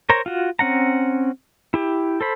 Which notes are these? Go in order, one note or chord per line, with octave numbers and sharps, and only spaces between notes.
A#4 C5 C#5 A#5
F4 F#4
C4 C#4 F#5 A#5
E4 G4
A4 C5 B5